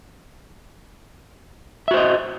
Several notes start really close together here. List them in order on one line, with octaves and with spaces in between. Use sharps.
E5 F#4 C5 D#5